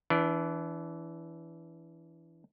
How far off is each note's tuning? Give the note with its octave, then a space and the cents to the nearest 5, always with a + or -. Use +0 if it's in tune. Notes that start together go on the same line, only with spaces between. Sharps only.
E3 +0 D4 -30